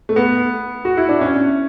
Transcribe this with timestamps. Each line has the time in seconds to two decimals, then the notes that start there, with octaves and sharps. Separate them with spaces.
0.09 A3
0.16 B3
0.85 F#4
0.97 E4
1.09 D4
1.21 C#4